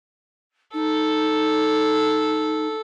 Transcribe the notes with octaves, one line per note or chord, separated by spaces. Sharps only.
D#4 A4